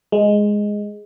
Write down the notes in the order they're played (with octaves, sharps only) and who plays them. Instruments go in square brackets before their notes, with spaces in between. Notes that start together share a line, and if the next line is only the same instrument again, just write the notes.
[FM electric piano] G#3